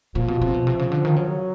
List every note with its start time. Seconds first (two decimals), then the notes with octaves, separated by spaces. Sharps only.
0.15 A#2 F3
0.28 B2
0.42 C3
0.54 B2
0.67 C3
0.79 C#3
0.92 D3
1.05 D#3
1.16 C#3 F#3